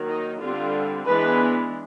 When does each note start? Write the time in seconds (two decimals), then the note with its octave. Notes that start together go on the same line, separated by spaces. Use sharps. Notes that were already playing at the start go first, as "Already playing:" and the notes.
Already playing: D#3 F#3 A#3
0.08 D#4
0.41 D3 G3 C4 F4
1.06 E3 G#3 B3 D4 B4